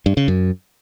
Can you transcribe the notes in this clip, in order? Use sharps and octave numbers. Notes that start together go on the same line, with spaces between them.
G2
C#3
F#2